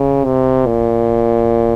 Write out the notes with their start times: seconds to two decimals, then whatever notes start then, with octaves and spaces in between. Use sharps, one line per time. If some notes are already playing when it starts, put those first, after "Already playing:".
Already playing: C#3
0.25 C3
0.66 A#2